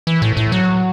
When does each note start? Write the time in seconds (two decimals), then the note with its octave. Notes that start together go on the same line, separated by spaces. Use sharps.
0.07 E3
0.22 A2
0.37 A2
0.52 F#3